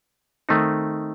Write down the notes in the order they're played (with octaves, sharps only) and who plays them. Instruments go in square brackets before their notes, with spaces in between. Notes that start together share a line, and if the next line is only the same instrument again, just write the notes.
[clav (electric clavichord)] D#3 A3 C4 D#4